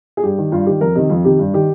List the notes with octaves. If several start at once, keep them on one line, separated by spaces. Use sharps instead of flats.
G#4
G2 G4
D#3
G2 F4
D#3 G4
F2 A#4
C3 D#3 D#5
F2 F4
C3 D#3 G4
G2
D#3 G4